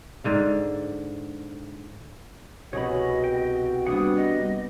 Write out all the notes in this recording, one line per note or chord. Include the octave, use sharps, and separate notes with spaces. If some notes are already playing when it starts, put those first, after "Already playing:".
G#2 D3 F5
C2 B2 F#4 G#4 C#5 D#5 B5
G5
G3 A#3 B3 D4 F#5 D#6
D#5